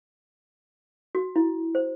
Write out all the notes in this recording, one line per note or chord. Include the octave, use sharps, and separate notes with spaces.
F#4
E4
C5